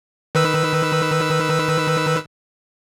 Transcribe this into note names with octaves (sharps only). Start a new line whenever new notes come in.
D#3 B4 E6